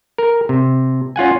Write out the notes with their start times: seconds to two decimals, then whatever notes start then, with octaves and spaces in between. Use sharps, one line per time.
0.18 A#4
0.49 C3
1.16 C#4 F4 F#5 G#5